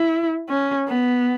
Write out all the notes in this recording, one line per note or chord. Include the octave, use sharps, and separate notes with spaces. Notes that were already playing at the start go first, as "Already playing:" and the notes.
Already playing: E4
C#4
B3